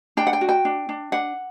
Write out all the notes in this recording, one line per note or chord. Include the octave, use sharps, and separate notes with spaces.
D4 G5
F#5
G5
F#4
G5
D4
D4
D4 F#5